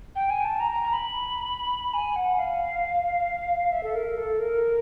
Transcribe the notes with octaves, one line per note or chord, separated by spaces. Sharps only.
G5
G#5
A5
A#5
A#5
A#5
B5
G#5
F#5
F5
E5
A4
A#4
A4
A#4